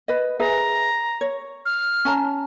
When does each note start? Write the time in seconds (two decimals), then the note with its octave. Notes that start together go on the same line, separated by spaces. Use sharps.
0.08 B4 D#5
0.40 G#4 B4 E5 A#5
1.21 C#5
1.65 F6
2.05 C#4 A5 A#5